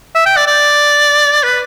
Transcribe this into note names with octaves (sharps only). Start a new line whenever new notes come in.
E5
G5
D5
D5
B4